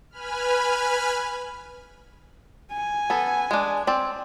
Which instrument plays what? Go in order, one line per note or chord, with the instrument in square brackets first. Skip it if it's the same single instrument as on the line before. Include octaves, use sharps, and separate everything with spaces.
[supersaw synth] B4 G#5 B5 F6
[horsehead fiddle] G#5
[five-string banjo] B3 A4
G#3 D4
C4 D5